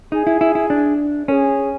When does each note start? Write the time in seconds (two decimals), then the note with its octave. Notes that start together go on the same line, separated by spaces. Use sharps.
0.12 D#4 G#4
0.27 E4
0.41 E4
0.55 E4
0.70 D4
1.28 C#4 G#4 A#4